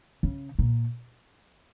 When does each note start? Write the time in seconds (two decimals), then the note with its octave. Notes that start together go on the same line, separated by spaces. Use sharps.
0.23 C#3
0.59 A#2